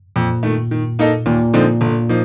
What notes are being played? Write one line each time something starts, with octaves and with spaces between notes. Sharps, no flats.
F2 A#2
D#3 A3
D#3
A#3 D#4 A4 D#5
D#2 A#2
D3 F3 C4 D#4
G1
F3 A#3 D#4